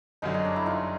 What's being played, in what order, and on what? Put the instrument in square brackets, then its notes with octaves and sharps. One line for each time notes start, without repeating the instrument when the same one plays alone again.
[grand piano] G1 F#2 D3 F#3 [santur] D#4
[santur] D#4
D4
E4
D#4 F4